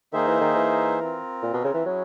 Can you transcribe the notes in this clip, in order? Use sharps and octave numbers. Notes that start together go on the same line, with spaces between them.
D#3 A#3 D#4 G#4 C5 E5
E3
D#3
E3
C4 F4 A#4
A#2
B2
C#3
E3
F#3 C#4 E4 G#4